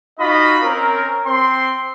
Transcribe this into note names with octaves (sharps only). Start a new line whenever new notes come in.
D#4 F4 F#4 D#5 B5
C4 C#4 A#4
C4 C6